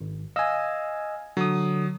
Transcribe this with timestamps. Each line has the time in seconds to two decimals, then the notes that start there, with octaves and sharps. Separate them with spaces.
0.01 G#1
0.36 D#5 F5 G#5 E6
1.37 D3 F#3 D#6